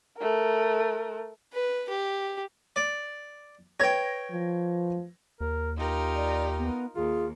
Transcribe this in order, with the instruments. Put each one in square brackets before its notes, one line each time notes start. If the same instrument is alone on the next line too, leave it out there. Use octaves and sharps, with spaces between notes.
[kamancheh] A3 A#4
[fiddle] B4
G4
[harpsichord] D5
[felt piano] B4 G#6 A#6 [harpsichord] C#5 G5
[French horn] F3
[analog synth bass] D#2 [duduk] A#4
[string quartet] D#4 F4 A#4 [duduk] G4
[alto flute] D5
B3
[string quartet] D#2 [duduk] F4 [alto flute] G#4